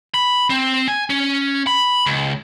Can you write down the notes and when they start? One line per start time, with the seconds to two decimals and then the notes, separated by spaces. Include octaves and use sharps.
0.14 B5
0.50 C4
0.88 G#5
1.10 C#4
1.67 B5
2.06 C#2